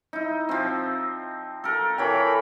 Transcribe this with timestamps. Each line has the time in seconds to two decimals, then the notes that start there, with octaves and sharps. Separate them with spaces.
0.13 D#4 E4
0.49 F3 C4
1.64 A4 A#4
1.98 E3 A4 A#4 C#5 G5 B5